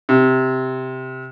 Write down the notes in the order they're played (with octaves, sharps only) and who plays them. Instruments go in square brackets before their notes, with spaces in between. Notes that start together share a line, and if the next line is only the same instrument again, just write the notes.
[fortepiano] C3